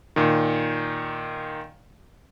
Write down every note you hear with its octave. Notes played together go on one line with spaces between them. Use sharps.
A#2 D#3